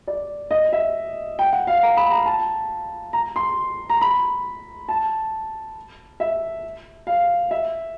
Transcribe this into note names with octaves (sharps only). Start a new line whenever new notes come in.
D5
D#5
E5
G5
F#5
F5
A#5
B5
A#5
A5
A#5
C6
A#5
B5
A5
E5
F5
E5